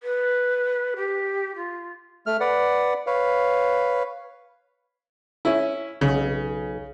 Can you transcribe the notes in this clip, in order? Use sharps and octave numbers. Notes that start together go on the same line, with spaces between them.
B4
G4
F4
A3 F6
B4 D5 F#5
B4 C#5 F5
C#4 E4
B1 C#3